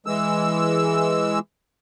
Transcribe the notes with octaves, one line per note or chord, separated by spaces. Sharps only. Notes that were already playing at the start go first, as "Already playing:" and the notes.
E3 G#3 E6